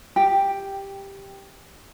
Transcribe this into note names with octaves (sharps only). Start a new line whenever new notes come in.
G4 G5